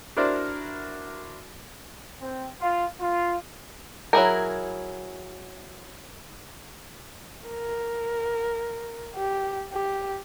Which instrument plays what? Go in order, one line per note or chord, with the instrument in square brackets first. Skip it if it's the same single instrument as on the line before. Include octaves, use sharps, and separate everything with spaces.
[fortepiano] D4 E4 F#4 A#4 C5 D5
[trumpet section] C4
F4
F4
[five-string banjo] F#3 E4 G#4 A#4
[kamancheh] A#4
G4
G4